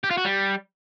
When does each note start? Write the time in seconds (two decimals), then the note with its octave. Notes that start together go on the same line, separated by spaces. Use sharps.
0.04 G4
0.11 F4
0.18 F#4
0.24 G3